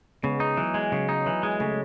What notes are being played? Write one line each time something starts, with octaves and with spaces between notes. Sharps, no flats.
C#3 G#3 B3
D#4
E3 F#3
G#3
C#3 F#3
D#4
E3 F#3
G#3
C#3 A3